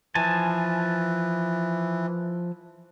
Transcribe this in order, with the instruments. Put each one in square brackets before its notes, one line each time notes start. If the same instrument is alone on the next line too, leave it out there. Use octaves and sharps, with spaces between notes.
[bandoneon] E3 [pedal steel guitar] F3 G#5 A5